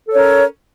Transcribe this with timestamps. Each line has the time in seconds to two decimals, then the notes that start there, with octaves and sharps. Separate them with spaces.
0.08 A4
0.12 C#5
0.15 C#4
0.18 A#4